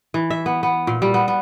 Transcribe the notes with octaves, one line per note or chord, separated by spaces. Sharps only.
E3
E5
B3
B3
A#2
G3
B3
B3